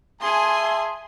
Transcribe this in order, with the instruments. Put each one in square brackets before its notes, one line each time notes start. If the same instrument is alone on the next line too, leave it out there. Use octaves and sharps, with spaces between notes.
[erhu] G#4 [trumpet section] E5 A5 [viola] G#5 C6